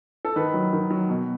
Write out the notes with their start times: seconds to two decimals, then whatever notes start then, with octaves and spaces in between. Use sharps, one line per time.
0.25 A4
0.36 D#3 B4
0.54 F#3
0.73 D#3
0.90 F#3
1.09 B2